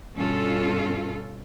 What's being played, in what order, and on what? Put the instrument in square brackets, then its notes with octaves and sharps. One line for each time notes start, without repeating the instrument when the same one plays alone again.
[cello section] G2 B2 C#4 F4 A4